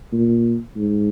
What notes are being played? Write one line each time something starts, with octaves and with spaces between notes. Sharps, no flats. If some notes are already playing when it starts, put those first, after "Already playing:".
A#2
G#2